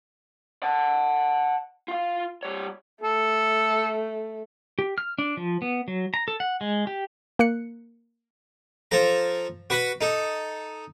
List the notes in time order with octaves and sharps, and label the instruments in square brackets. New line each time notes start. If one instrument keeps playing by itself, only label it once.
[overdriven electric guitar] F#5 A5
F4 F5
G3 C#5
[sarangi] A3 [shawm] A4
[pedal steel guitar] G4
F6
D4
F3
B3
F#3
A#5
A4
F#5
G#3
G4
[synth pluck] A#3 F#6 C#7
[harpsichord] F3 A4 A#5
F#4 B4 F#5 B5
D#4 A4